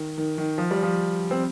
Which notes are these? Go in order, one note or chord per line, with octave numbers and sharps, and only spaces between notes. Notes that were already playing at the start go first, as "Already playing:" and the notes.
Already playing: D#3
D#3
D#3
F3
G3
F3
C4